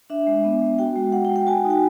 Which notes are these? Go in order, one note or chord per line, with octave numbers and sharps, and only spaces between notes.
D4 E5
G#3
B3
G#3
F#4 G5
G#3
G#3 F#5
G5
G#3
G5
F#4 G#5
D#4
G5